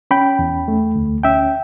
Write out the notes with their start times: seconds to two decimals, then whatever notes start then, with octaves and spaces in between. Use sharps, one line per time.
0.11 C#4 G5 B5
0.39 E2
0.68 A3
0.96 D2
1.24 C#4 E5 G5